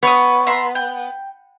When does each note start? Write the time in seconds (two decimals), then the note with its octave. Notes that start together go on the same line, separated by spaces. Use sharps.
0.03 B3 C#5 C#6 D#6
0.47 E5 A#5 C6
0.75 G5